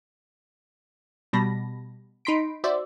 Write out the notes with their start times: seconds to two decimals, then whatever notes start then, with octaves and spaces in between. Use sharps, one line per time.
1.33 B2 G3 A5 B5 A#6
2.25 D#4 B5 C6 B6 D7
2.64 F#4 C5 D5 E5